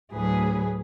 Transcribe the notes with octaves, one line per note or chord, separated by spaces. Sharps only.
D2 A2 F#3 G#4 B4